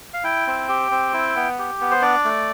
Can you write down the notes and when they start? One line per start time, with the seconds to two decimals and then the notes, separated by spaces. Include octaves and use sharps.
0.14 F5
0.24 E4 G5
0.47 C4
0.69 G4
0.91 C4
1.14 E4
1.36 B3
1.59 G4
1.81 B3
1.91 C5
2.02 D4 D5
2.25 A3